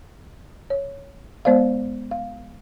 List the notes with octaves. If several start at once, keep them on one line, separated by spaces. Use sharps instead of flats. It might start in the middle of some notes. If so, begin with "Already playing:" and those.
C#5
G#3 B3 C5 D5 F5
F5